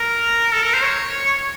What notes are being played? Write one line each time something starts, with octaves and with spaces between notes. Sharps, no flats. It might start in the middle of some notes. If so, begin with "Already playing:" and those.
Already playing: A#4
A4
A#4
C5
C#5